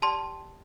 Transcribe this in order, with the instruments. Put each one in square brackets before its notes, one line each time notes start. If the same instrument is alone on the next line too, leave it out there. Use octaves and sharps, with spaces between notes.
[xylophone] G4 D5 G5 A5 C6